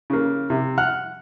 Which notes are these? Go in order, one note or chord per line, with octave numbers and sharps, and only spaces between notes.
C#3 A#3
C3
F#5 F6 F#6